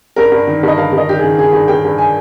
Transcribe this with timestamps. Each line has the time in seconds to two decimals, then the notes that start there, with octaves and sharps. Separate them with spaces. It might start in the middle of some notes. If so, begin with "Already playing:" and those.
0.16 G2 A#4
0.32 G2
0.47 D#3
0.63 G2 D#5
0.77 G2 F5
0.93 G2
0.98 D#5
1.08 D#3 G4
1.19 G#4
1.24 D#3
1.38 D#3 G#4
1.53 G2
1.68 G2 G5
1.84 G2
1.98 G#5